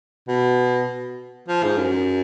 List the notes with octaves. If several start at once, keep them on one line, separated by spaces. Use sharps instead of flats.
B2
F3
G#2
F#2